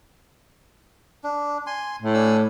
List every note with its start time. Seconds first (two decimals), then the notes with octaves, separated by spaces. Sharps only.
1.24 D4
1.67 G#5 C6
2.02 A2
2.14 D4 G#5 E6